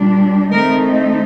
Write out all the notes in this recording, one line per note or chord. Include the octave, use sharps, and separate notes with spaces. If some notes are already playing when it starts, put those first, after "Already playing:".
Already playing: A#2 G3 D4
D#3 A3 C4 D#4 A#4